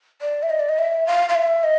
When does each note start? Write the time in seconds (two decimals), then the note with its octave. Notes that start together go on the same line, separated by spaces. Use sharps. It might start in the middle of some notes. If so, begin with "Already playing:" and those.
0.22 D5
0.43 E5
0.50 D#5
0.59 D5
0.69 D#5
0.78 E5
1.06 F5
1.29 F5
1.35 E5
1.63 D#5